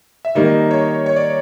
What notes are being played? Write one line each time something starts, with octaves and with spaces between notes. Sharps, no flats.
E5
D#3 G3 A#3 D#4 D#5
C#5
C#5
D5